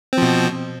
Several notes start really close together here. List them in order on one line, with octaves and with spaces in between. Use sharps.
C4 F3 B2